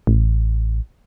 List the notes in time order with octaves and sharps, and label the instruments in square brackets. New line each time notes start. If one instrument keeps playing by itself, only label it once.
[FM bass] A1